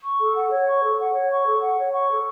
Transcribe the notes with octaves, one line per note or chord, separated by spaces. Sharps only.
C#6
A4
F#5
C#5
C#6
A4
F#5
C#5
C#6
A4
F#5
C#5
C#6
A4